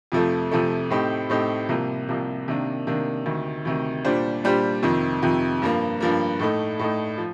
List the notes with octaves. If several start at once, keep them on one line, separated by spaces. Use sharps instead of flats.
F2 C3 F3 A3
F2 C3 F3 A3
A2 A3 C4 D#4 G4
A2 A3 C4 D#4 G4
C2 C3 F3 A#3
C2 C3 F3 A#3
C3 D#3 A#3 D4
C3 D#3 A#3 D4
D2 C3 D#3
D2 C3 D#3
A#2 G3 D4 G4 C5
A#2 G3 D4 G4 C5
F2 C3 D#3
F2 C3 D#3
G2 F3 A#3
G2 F3 A#3
A2 A3 D#4
A2 A3 D#4
F3